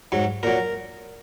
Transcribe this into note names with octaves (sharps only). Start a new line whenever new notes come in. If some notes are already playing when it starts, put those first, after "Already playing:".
G#2 F#3
A#2 F#3 A#4